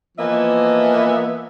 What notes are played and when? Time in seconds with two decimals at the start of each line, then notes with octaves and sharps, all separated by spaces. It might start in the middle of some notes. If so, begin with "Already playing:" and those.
0.18 E3 F3 A#3 B3 D#5 E5